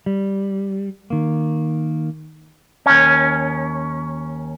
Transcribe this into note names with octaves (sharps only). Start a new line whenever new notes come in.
G3
D#3 A#3
D#2 C#4